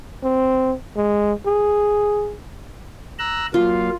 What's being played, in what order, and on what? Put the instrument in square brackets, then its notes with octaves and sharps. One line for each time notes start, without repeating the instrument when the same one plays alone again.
[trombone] C4
G#3
G#4
[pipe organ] A#5 E6 F#6
[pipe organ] F#3 A#3 F5 [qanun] F4